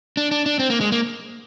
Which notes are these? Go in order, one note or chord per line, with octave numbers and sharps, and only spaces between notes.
D4
D4
D4
C4
A#3
G#3
A#3